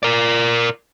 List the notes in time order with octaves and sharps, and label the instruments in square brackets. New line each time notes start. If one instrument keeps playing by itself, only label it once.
[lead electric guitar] A#4 D5